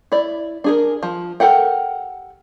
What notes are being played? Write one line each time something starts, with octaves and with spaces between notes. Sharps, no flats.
E4 D5
D4 G#4 A#4
F3
G4 A4 A#4 F#5 G5